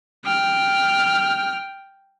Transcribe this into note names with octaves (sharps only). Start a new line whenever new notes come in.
G5 F6